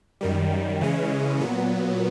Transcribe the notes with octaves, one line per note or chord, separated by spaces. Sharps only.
F#2 D#3 G3
C#3 E3 G#3 C#4
A#2 F#3 B3